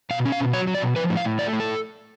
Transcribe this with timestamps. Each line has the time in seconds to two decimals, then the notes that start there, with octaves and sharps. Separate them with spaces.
0.10 B2 F5
0.25 C#4
0.32 F5
0.39 B2
0.53 F#3 C#5
0.67 F#3
0.74 D5
0.82 B2
0.96 F3 B4
1.10 A2
1.17 F5
1.25 A2
1.39 A3 D5
1.53 A2
1.60 A4